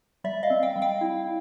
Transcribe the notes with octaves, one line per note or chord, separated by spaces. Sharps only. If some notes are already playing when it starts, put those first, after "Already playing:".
G3 D5 E5
D#5 F5
C4
F5 G5
G3
F5 G5
E4